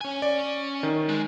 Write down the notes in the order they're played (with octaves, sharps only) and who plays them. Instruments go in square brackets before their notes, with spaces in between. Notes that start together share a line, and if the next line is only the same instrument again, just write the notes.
[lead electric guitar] C#4 G#5
[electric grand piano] D5
D#3
[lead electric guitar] G#3